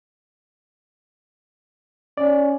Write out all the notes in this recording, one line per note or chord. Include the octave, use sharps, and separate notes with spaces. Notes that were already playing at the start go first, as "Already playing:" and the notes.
C#4 D5